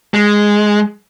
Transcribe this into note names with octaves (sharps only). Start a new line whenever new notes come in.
G#3